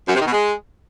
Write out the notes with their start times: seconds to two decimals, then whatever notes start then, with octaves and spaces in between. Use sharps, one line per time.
0.08 F#2
0.14 C3
0.20 D#3
0.26 B2
0.31 G#3